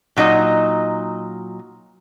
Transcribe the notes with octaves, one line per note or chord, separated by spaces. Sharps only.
A#2 F#3 D#4 D#5